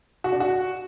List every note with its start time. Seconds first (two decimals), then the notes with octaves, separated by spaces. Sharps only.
0.24 F#4
0.32 D4
0.40 F#4